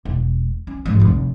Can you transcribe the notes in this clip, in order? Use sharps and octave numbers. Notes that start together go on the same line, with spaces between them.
E1
C#4
G#2 F3
F1 D3